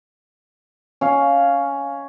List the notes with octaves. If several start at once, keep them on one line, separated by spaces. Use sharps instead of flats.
C#4 F5